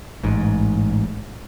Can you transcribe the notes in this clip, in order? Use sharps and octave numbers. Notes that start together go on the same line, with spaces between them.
A1 G#2